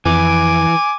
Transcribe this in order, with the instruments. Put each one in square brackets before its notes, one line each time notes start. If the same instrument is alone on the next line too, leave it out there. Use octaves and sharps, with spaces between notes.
[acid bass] F2 [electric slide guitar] E3 [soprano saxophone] G#5 [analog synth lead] D6